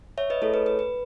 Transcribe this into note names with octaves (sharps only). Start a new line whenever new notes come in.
C#5 E5
B4 D#5
A3 E4 G#4 A4 C#5
B4
B4
B4